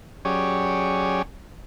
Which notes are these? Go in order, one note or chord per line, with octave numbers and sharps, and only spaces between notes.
F#3 C#4 G4 G#4 C#5 D5